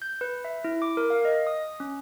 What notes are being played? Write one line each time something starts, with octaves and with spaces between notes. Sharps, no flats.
G6
B4
E5
E4
D6
A#4
F5
D#5
D#6
C#4